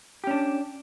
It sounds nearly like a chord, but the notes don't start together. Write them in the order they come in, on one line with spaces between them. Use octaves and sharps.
G4 C#4 D4